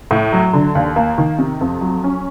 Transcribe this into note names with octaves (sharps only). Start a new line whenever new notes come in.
A2
F#3
D3
D#2
A#3
D#3
C3
F2
F#3
C#4